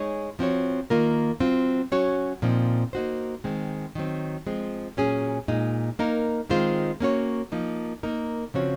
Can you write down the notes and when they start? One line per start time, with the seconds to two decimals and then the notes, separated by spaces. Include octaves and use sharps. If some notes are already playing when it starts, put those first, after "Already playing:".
Already playing: G#3 D#4 G#4 C#5
0.39 F3 C4 F#4 C#5
0.90 D#3 A#3 F4 A#4
1.40 F#3 C4 F4
1.92 F#3 C#4 F#4 C#5
2.42 A#2 F3 C4 D#4
2.93 A#3 D#4 F#4 C5
3.44 D#3 G#3 C4
3.95 D#3 F#3 C4
4.46 F3 G#3 C4
4.97 A#2 F#3 C#4 G#4
5.48 A#2 G#3 D#4
5.99 A#3 D#4 A#4
6.49 D#3 G#3 C4 F4 C5
7.00 A#3 C#4 F#4 A#4 C#5
7.52 F3 A#3 D#4
8.03 A#3 D#4 A#4
8.54 C#3 F3 C4 F#4 C#5